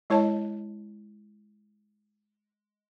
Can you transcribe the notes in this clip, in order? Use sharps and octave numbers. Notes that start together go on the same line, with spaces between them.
G#3 E4 C#5 D#5 A5